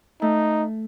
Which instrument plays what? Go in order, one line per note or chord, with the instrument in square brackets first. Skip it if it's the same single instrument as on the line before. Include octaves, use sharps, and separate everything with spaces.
[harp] A3 [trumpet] D#4